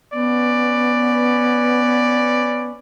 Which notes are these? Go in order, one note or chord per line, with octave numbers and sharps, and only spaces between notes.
B3 C#4 B4 D5